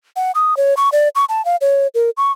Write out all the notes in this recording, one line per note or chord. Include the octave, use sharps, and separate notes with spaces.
F#5
D#6
C#5
C#6
D5
C#6
A5
F5
C#5
A#4
C#6